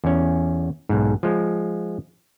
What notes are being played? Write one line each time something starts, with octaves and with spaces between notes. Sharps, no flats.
E2 C#4
B1 G#2
F3 G#3